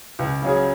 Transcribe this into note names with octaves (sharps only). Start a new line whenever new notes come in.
C#2
C#3 F#3 C#4 G#4